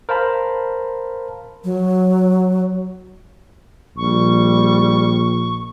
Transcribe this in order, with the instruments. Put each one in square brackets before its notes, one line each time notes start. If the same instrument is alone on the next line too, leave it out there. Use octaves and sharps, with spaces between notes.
[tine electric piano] A#4 C5 F5 A5 B5
[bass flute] F#3
[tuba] A#1 [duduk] G3 [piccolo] C#6